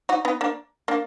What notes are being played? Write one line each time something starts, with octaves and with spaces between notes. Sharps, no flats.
D#4 F#4
B3 D#4
A#3 D4
A#3 D4